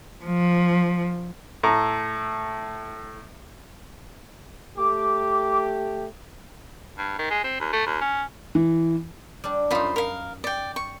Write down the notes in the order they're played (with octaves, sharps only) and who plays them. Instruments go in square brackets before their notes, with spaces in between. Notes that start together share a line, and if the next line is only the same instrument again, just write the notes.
[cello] F3
[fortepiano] A2 A3 A#5
[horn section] A3 G4 [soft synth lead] D6
[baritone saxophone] G2
D#3
G#3
C4
D#2
A3
D#2
C#4
[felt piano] E3
[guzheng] G3 D4
[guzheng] F#2 D#4 [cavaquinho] F4 C5 B5
[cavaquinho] A#4 F5
D5 G5
C#6